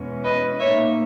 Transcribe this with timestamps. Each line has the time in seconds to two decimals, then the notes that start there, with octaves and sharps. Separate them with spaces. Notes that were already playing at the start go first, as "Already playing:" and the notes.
Already playing: E2 B2 G#3 C#4
0.24 B4 D#5
0.59 A#2 A#3 D#4 C#5 E5